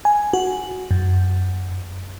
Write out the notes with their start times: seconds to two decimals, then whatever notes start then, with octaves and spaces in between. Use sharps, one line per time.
0.05 G#5
0.33 F#4
0.91 F#2